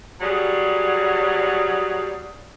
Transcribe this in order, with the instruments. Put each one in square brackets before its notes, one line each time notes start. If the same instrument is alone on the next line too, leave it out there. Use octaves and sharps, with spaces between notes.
[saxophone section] F#3 G3 G#4